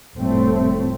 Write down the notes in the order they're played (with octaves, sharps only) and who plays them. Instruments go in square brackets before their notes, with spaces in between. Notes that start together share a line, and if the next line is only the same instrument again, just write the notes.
[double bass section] F1 A2 G3 A3 C4